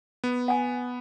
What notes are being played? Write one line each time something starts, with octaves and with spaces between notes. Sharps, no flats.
B3
F#5 G#5